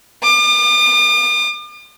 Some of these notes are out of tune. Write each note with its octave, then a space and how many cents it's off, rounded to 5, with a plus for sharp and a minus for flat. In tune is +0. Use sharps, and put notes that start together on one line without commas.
D6 +45